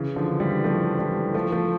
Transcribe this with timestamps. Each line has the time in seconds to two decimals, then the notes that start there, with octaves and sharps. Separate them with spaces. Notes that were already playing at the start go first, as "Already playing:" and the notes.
Already playing: C#3 E3
0.16 D3 F3
0.40 E3 G3
0.64 F3 A3
0.99 E3 G3
1.34 F3 A3
1.52 F3 A3